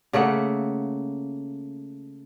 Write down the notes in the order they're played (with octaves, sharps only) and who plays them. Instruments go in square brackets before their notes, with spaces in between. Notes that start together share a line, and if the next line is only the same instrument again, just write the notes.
[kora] C#3 A3 A#3 F#5